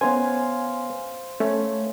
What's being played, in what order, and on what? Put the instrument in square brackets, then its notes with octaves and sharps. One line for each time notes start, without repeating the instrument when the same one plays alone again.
[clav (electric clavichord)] B3 C#4 [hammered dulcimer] C5 F5 [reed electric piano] G#5
[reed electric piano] A3 [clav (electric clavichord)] C#4